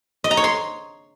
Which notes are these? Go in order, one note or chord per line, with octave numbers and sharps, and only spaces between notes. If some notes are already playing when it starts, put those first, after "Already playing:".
D#5
A#5
C#5
C6